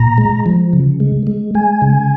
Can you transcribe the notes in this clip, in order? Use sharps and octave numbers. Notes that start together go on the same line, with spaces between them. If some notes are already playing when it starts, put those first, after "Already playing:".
Already playing: A#2 A#5
G#3
F3
C#3
G#3
G#3
G#3 G#5
C#3